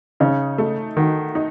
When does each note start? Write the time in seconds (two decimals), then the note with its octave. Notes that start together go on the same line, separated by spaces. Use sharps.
0.20 C#3 D#4
0.58 A3
0.97 D#3 F#4
1.35 D#4